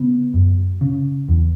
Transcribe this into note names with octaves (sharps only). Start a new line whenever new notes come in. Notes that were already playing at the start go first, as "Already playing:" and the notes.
Already playing: C#3 B3
F#2
C#3
E2